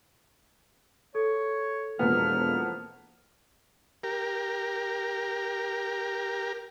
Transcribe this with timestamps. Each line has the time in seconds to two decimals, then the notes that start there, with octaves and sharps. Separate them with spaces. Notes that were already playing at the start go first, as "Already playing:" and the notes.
1.15 A4 C#5
1.99 E1 F2 A#3 B3 F6
4.03 G4 A#4